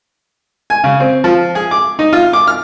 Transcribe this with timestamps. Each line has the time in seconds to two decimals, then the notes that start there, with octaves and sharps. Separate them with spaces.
0.70 G#5
0.84 C#3
1.00 C4
1.24 F3
1.55 G#4
1.71 D6
1.99 D#4
2.13 F4
2.33 D6
2.47 F6